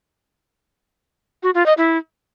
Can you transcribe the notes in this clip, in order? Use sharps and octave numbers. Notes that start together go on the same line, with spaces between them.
F#4
F4
D#5
E4